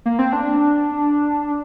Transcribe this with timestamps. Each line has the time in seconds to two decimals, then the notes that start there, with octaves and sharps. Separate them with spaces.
0.06 A#3
0.19 C4
0.33 D4